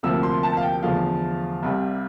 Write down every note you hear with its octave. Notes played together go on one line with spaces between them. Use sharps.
D2 C3 F3 A#3 E6
C6
A5
F5
G5
E2 D3 F3 A3 F5
C2 C3 G3